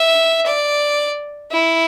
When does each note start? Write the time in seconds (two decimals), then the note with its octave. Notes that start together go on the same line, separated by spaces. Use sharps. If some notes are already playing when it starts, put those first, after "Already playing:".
Already playing: E5
0.46 D5
1.51 E4